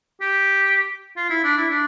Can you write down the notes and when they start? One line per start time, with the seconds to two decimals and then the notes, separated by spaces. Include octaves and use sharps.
0.21 G4
1.16 F4
1.30 E4
1.44 D4
1.57 E4
1.70 D4